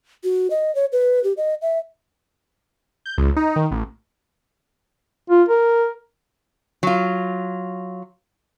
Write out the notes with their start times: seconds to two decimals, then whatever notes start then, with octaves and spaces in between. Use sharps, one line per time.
0.24 F#4
0.50 D#5
0.75 C#5
0.92 B4
1.24 G4
1.37 D#5
1.62 E5
3.06 G6
3.18 C#2
3.36 D#4
3.56 D#3
3.71 A1
5.30 F4
5.49 A#4
6.83 F#3 F4